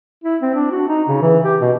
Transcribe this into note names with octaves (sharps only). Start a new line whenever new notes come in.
E4
C4
D4
F#4
D#4
C#3
E3
G4
B2